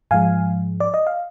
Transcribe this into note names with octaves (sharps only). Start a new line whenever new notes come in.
G#2 F3 G#3 F5 G#5
D5
D#5
F5